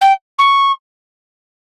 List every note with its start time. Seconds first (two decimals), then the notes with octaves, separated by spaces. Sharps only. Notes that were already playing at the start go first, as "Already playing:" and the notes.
0.01 G5
0.38 C#6